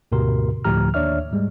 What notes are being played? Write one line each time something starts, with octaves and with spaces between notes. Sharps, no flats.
D2 G#2 B2 G4 A#4 C6
D2 A2 F3 G4 A#5 F6
D#2 D4 C#5 D5 E5 F6
G#2 G3 G#3